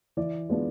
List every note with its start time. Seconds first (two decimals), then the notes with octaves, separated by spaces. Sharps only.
0.17 E3 D5
0.49 G#3 B3 D4 F4